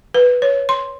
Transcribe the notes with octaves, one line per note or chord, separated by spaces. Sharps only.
B4
C#5
C6